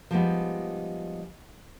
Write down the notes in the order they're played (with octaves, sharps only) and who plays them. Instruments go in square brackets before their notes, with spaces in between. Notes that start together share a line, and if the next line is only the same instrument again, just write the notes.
[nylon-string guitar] F3 G3 G#3 A#3 B3 D#4